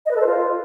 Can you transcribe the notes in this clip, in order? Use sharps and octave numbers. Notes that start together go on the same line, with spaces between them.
D#5
B4
A4
C5
F4